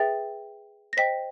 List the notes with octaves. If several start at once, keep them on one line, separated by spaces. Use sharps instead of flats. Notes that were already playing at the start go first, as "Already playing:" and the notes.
Already playing: G#4 B4 E5 G5 A6
A#6
C5 D#5 G5 B6